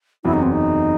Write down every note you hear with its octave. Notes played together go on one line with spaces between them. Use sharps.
F#1 E2 C3 F#3 E4
D#4
C4
D#4